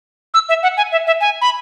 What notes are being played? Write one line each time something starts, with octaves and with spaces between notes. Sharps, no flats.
E6
E5
F#5
G#5
E5
E5
G#5
B5